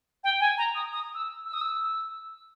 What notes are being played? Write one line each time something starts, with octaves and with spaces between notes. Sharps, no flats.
G5
G#5
A#5
D#6
D#6
E6
E6
D#6
E6